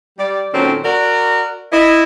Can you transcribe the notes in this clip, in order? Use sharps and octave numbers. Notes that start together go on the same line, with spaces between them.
G3 D5
A#2 D#3 F#3 C4 C#4 A4
F#4 A#4 D5
E4 D#5